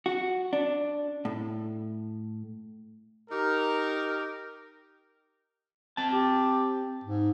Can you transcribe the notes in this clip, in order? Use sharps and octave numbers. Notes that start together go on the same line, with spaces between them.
F#4
D4
A2
D#4 G4 A#4
C4 A5
G4
G#2